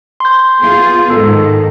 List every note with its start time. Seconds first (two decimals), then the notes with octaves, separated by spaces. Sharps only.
0.20 C6 G6
0.63 B3 F4 G#4
1.10 G#2 D#3 A4